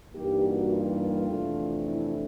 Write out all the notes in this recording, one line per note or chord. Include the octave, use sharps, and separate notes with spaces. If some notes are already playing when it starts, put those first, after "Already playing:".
G2 E3 G3 A#3 D#4 G4
F#4
F4
F2 C3 E3 A3 D4
E4